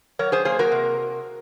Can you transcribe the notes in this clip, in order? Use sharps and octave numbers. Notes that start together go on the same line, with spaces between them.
F#3 A#4 C#5
G#4 C5
A#3 G#4 C5
F#4 A#4
C3